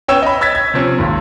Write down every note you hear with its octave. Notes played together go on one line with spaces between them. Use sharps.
B3 C#4 C#5 G5 E6 E7
D#5 B5
E6 G#6 A6 B6
G#6
C3 F3 C4 C#4
G#1 D#2